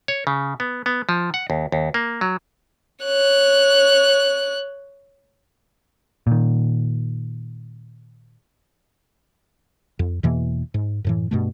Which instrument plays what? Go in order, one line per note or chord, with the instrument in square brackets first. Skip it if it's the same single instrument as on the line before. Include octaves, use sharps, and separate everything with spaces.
[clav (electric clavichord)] C#5
C#3
B3
B3
F3
F#5
D#2
D#2
A#3
F#3
[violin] C#5 F#6
[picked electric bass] A#2 D#3
[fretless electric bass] F2
E2 B2 E3 A#3
G#2
F#2 A2 E3
G2 B2 A3